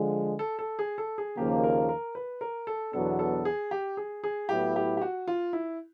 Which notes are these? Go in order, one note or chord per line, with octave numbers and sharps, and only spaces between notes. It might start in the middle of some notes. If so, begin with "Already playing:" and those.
Already playing: D3 F3 G#3
A4
A4
G#4
A4
G#4
D#2 C#3 F3 A#3 G4
A#4
A#4
B4
A#4
A4
E2 B2 F#3 B3 D4 A4
A4
G#4
G4
G#4
G#4
A2 F#3 B3 E4 G4
G4
G4
F#4
F4
E4